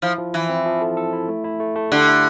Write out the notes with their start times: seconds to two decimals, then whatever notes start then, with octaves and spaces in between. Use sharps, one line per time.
0.02 F3 E4
0.18 F3
0.34 E3 E4
0.49 C4
0.66 F3
0.81 A4
0.97 A4
1.13 E4
1.29 A3
1.44 E4
1.60 A3
1.76 A3
1.92 D3 G4
2.08 E4